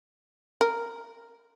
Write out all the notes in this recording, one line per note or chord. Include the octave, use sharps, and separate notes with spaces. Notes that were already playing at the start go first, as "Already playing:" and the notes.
A#4